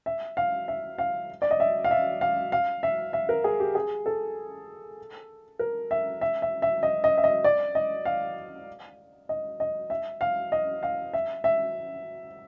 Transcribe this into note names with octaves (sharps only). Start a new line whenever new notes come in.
E5
F5
E5
F5
D5
D#5
E5
F5
E5
F5
F5
E5
E5
A#4
G#4
G4
G#4
A4
A#4
E5
E5
E5
E5
D#5
D#5
E5
D#5
D5
D#5
F5
D#5
D#5
E5
F5
D#5
F5
E5
E5